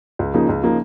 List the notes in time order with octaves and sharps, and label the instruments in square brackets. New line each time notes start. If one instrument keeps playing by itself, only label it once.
[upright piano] C#2
C#3 F3 A#3 D#4
C#2
C#3 F3 A#3 D#4